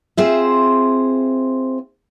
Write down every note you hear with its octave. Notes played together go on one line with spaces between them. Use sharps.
C4 F4 G#4 C5 E5